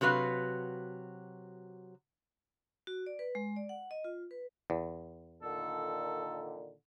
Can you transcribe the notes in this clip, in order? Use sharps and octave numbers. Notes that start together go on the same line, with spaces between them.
C3 F#3 F#4 B4 F5
F#4
D5
B4
G#3
D5
F#5
D#5
F4
B4
E2
A#2 D3 D#3 A4